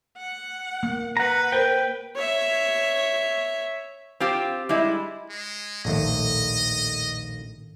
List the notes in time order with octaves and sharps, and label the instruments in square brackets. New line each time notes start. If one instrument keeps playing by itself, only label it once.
[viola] F#5
[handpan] A#3
[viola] B4 [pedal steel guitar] F#5 A#5
[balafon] A#4 C5 [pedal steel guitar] G5
[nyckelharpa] C#5 E5
[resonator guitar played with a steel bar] C4 F4 G4
G3 G#3 E4
[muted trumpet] G#3
[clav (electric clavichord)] A#1 D#2 A3 [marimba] A2 D#3 [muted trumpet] D#5